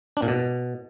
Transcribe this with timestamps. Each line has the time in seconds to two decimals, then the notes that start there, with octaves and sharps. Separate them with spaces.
0.17 D4
0.22 A#2
0.28 B2